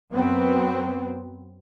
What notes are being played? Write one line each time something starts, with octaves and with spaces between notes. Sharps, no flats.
F#2 F#3 B3 C4